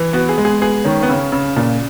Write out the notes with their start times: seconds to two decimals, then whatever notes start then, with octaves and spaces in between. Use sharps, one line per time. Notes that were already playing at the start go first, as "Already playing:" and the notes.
Already playing: E3
0.13 B3 F#4
0.29 G#4
0.38 G#3
0.45 G#4
0.61 B3 G#4
0.85 D#3 C#4
1.03 B3
1.09 C#3 C#4
1.32 C#3
1.57 A#2